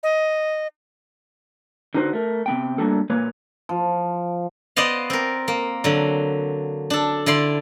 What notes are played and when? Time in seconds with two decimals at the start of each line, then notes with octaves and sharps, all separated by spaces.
0.03 D#5
1.94 D3 D#4 F#4 B4 C5
2.13 A3 A#4
2.46 C3 B3 G5
2.78 F#3 G3 A3 A#3 D4 A4
3.10 A#2 A#3 B4 C#5
3.69 F3
4.76 B3 C5 D5 D#5 F5
5.10 C4 A#4
5.48 A#3
5.84 D3 F#3
6.90 D4 A4
7.26 D3 E4 D5 C6